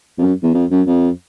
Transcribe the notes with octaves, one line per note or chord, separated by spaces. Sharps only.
F2
F#2
E2
F2
F#2
F2